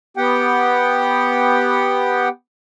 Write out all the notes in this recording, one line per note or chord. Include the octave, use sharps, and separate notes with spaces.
B3 G4 F#5 G5